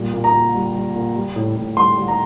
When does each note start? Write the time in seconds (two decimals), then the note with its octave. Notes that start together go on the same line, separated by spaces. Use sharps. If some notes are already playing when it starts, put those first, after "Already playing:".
Already playing: A#2 G3
0.14 A#2
0.24 A#5
0.34 A#2
0.54 G3
0.74 G3
0.95 A#2
1.15 G3
1.36 A2
1.56 A2
1.77 G3 C6
1.97 G3
2.08 A#5